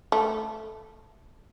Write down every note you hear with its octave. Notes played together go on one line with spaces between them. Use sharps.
A3